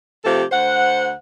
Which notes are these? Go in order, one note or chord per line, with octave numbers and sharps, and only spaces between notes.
C3 F3 A3 G4 A4
D2 C5 F#5